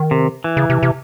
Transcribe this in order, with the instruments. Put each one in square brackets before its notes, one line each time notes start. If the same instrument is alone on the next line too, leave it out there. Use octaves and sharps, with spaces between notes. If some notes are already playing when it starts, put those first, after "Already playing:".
Already playing: [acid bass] D#3
[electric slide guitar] C3
E3
[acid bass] C#3
C3
C3